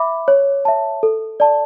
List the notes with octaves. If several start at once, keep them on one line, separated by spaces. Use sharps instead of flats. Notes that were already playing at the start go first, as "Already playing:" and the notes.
Already playing: E5 B5 D6
C#5
E5 A5
A4
D5 A5